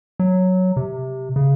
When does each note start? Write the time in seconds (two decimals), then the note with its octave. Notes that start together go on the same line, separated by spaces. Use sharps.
0.20 F#3
0.77 C3
1.36 C#3